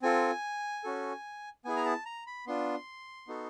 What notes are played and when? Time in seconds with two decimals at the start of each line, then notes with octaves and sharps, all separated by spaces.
0.02 C4 F4 A4 G#5
0.84 C#4 F#4 A4
1.65 B3 E4 G#4 G#5
1.76 A#5
1.85 A5
2.05 A#5
2.27 B5
2.47 B3 D4 F4 C6
3.28 B3 D#4 F#4 A4